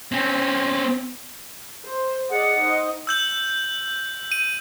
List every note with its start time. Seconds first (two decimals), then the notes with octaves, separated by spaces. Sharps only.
0.12 C4 C#4
1.83 C5
2.30 G#4 D5 D#5 F#5
2.60 D#4 C5 D#5
3.07 E6 G6 F#7
4.32 D#7